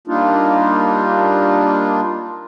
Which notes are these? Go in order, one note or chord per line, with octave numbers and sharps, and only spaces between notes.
G3 A#3 D4 D#4 F4